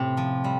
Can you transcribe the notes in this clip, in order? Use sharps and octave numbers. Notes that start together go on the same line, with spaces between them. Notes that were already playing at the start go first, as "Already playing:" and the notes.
Already playing: A2 C3 A3 C4
F3
G3